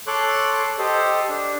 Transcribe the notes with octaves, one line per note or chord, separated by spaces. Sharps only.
A4 C#5 C6 D6 F#6
G4 A4 C5 D#5
D4